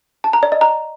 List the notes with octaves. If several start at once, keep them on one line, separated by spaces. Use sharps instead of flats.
A5
A#5
D5
D#5
A#5